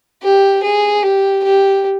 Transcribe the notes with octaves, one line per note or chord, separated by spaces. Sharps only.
G4
G#4
G4
G4